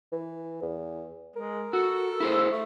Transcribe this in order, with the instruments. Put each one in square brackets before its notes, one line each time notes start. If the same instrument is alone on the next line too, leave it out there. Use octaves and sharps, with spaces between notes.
[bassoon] E3
E2
[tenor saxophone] G#3 [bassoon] A#4
[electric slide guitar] F#4 [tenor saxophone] A4
[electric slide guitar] E4 G#4 C5
[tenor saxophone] A3